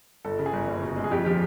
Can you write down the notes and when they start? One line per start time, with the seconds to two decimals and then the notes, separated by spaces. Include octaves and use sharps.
0.25 G1 A4
0.39 C#3
0.46 G#4
0.53 G1
0.68 F#1
0.82 B2
0.96 G#3
1.04 G#4
1.11 F2 G4
1.25 F3 G4